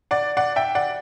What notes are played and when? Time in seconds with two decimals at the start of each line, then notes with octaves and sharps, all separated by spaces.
0.11 D5 F#5
0.37 D5 F#5
0.56 E5 G5
0.75 D5 F#5